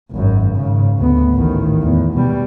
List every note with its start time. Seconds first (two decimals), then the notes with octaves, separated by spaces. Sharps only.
0.11 G#1 F#2
0.56 G#2 C#3
0.99 D2 B3
1.33 A1 D#3
1.82 E2
2.14 B2 G3